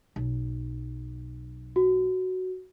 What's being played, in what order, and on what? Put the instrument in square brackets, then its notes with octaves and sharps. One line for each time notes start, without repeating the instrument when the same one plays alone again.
[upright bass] B1
[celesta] F#4